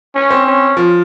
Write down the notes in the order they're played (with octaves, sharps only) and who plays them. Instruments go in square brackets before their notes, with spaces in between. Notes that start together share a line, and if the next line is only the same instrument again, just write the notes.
[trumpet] C#4
[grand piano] C4
[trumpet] C#4
[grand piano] F3